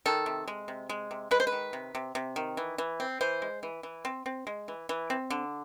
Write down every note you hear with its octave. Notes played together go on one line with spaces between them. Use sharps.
D#3 A4
C3
G#3
C3
G#3
C3
G#3 B4
C5
B4
D#3
C3
C3
C3
D#3
E3
E3
C4
E3 C5
G#3
E3
E3
C4
C4
G#3
E3
E3
C4
D3